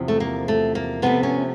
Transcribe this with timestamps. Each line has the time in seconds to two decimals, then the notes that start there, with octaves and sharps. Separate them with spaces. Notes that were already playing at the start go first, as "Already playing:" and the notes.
Already playing: E2 C3 F3
0.08 A3
0.20 A#3
0.48 A3
0.75 A#3
1.02 C3 F3 A3 B3
1.23 C#4